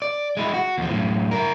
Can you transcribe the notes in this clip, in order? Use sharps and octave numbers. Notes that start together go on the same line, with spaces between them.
D5
G#3 E4
F#4
D#2 F3
F#2 A2
E4 A#4